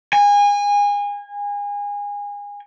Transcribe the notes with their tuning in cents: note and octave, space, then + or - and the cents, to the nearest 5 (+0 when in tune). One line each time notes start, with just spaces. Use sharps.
G#5 -25